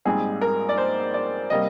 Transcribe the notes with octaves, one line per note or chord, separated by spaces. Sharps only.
A#1 G#2 G3 C4 D#4 G#4
A#4
D5
C5
D5
C3 G3 A#3 D#5